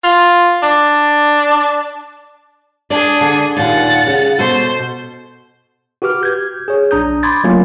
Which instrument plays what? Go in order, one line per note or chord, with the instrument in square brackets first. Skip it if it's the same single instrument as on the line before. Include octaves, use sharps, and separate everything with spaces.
[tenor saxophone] F4
D4
[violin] D4 G#4 [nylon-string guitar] D5
[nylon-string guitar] D3
[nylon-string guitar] D#2 A#2 [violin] F#5 A6
[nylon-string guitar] C#3
[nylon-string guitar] B2 F#4 A4 [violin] C5
[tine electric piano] F#4 G4 B4 D6 F6
G6 G#6
G#4 C#5
A#1 D4 A#5 D#6 G6
B5 C6 D6 G#6 A6
F#3 A3 A#3 C#4 F4